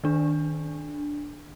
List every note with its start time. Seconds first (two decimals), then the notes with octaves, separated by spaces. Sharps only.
0.04 D#3 D4